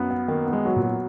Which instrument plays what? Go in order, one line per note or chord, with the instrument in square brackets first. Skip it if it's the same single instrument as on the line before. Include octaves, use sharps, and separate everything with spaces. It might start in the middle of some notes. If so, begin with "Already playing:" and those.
Already playing: [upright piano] F#2 B3
B3
[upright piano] D#3 [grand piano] A#3
[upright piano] B3
[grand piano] G#3
[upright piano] F#3
[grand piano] A#2
[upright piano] F#3